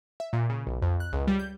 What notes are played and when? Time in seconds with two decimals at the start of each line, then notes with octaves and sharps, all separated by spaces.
0.20 E5
0.33 A#2
0.49 C#3
0.67 B1
0.82 F2
1.00 F#6
1.13 C#2
1.27 G3
1.39 G6